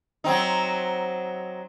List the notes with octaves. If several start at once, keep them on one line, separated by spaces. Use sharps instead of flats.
F#3 C4 D#4